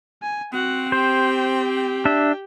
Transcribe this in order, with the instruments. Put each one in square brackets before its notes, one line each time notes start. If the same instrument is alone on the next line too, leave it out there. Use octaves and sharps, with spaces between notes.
[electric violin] G#5
[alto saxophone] C4 [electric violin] F#4 F#5
[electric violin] G4 G5 [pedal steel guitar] C5
[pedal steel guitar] D4 E5